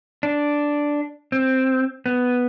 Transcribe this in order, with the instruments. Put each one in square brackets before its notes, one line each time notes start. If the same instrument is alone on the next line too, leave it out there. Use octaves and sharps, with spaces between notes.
[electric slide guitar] D4
C4
B3